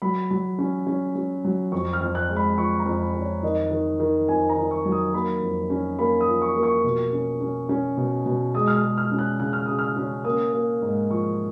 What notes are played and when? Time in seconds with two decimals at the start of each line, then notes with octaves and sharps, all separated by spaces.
0.02 F#3 B5
0.31 F#3
0.59 C#4
0.87 C#4
1.15 C#4
1.44 F#3
1.72 F2 C#6
1.93 F6
2.01 F2
2.15 F#6
2.29 G#3
2.36 B5
2.58 F3 C#6
2.79 A#5
2.86 F2
3.00 B5
3.14 F2
3.21 C#5
3.43 D#3 D#5
3.71 D#3
4.00 D#3
4.28 F2 G#5
4.49 A#5
4.57 D#3
4.71 C#6
4.85 F#3
4.92 D#6
5.14 A#3 B5
5.42 F2
5.70 C#4
5.99 A#3 B5
6.20 D#6
6.28 F3
6.42 C#6
6.56 A#3
6.63 C#6
6.84 B2
7.13 C#4
7.41 C#4
7.69 C#4
7.97 B2
8.26 B2
8.54 G#3 D#6
8.67 F6
8.76 D#6
8.83 G#3
8.98 F6
9.11 C#4
9.19 F#6
9.40 C#3 F#6
9.53 F6
9.66 C#3 D#6
9.79 F6
9.96 C#4
10.25 A#3 D#6
10.53 A#3
10.82 G#2
11.10 F3 C#6